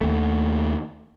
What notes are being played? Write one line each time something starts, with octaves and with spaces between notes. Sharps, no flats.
D#2 A3